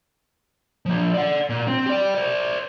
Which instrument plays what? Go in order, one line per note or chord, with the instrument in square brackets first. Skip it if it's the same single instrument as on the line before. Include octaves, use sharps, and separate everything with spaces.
[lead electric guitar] F3 A#3
D5 F#5
A#2
C4
G4 D5
C5 D5